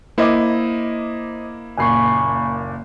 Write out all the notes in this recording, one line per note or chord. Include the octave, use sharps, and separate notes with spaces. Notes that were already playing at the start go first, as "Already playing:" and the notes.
A#3 E4 C5 D#5 D6
F#1 A#2 G#5 B5 C#6 C7